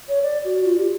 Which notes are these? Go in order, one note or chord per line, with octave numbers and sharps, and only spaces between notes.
C#5
D5
F#4
F4
G4